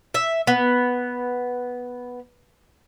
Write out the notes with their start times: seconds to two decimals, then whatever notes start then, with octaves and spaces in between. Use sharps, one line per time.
0.14 E5
0.47 B3